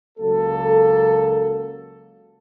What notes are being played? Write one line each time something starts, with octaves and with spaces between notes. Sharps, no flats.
C#2 F#3 A#3 A4